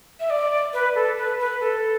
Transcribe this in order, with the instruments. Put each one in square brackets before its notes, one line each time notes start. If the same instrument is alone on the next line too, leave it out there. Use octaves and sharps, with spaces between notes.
[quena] E5
D5
B4
A4
B4
B4
A4